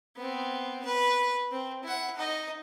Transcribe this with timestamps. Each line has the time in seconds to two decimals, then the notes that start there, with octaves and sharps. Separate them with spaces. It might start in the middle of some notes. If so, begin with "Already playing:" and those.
0.16 B3 C4
0.85 B4
1.52 C4
1.83 E4 F#5
2.16 D#4 D#5